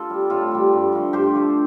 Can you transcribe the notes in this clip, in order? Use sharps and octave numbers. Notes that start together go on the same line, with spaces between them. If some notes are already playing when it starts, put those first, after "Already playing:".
Already playing: F4 A4 D5
G3 C4
A2 F4 A4
G3 C4
G2
D3 F3 A3
G2 G4 C5
D3 F3 A3